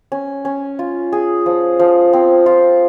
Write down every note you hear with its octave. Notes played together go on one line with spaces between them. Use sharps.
C#4
C#4
F4
G#4
F3
F3
C4
F4